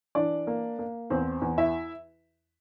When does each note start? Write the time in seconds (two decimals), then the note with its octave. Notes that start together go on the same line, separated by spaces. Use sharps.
0.15 E3 D4 D5
0.47 A#3
0.79 A#3
1.10 E2 C4 C5
1.42 E2
1.58 E4 E5